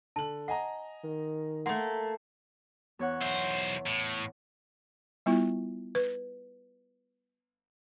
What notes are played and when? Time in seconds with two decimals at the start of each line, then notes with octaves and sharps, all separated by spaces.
0.16 D3 A5 F#7
0.48 D#5 F#5 G#5 A#5
1.04 D#3
1.66 A3 A#3 F#5 C6
2.99 E2 C#5 F#5
3.21 B1 C5 E5
3.87 A2
5.26 G3 B3 E4 F4
5.95 B4